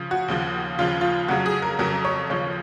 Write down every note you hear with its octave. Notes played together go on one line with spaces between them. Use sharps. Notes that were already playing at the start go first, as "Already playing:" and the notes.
Already playing: C#3 F3
F#4
D#2 C#3 F3
D#2 C#3 F3 F4
F4
F2 C#3 F#3 F#4
G#4
A#4
F2 C#3 F#3 A#4
C#5
D#2 C#3 F3 C#5